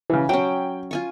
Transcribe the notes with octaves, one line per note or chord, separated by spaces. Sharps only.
C#3 E3
F#3 C#4 G5
F4 G#5 C#6